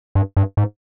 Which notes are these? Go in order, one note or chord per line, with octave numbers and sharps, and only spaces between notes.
G2
G2
G#2